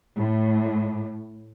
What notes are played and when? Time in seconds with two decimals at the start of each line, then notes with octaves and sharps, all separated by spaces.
0.17 A2